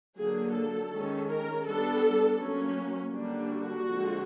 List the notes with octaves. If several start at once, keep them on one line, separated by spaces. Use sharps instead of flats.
D3 F#3 A#3 G#4
A4
D#3 G#3 C#4
A#4
G3 B3 D4 A4
F#3 A#3 C#4
D3 G3 A#3 D4
F#4
D3 F3 G#3 C4